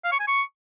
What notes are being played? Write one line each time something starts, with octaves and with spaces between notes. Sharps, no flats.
F5
C#6
G#5
C#6